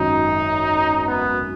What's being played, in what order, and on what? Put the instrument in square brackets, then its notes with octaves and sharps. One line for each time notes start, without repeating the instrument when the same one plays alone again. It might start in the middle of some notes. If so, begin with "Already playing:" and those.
Already playing: [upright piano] G#1 F#2 D#3 F#3 C#4 [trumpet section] D#4
[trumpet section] B3